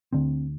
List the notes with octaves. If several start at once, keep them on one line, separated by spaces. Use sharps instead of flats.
D2 D3 C4